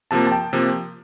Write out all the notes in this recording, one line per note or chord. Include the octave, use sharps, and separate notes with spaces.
C3 F3 A#3 A5
A5
G5
C3 F3 A#3